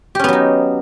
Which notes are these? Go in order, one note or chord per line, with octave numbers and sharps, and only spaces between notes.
F#3 B3 C#4 D#4 G4